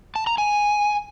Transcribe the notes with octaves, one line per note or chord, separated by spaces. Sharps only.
A5
A#5
G#5